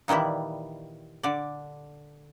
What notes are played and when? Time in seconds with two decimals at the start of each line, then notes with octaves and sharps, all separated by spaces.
0.08 A#2 D#3 E3 G3 E4
1.23 D3 D5